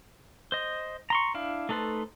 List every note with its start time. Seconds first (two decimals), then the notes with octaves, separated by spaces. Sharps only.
0.52 C5 D#5
1.10 A#5 C6 C#6
1.34 D4 E4 F5
1.69 A3 D#4 A4 B4 C5